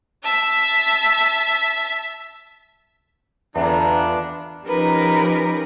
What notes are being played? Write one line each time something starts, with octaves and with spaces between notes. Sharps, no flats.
E5 A5
E2 D3 B3 D4 F4 A#5
F3 C#4 D#4 G4 A#4 B4